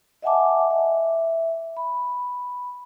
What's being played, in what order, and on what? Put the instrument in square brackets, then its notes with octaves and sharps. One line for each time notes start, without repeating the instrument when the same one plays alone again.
[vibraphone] D#5 E5 F#5 G#5 A5 D6
E5
B5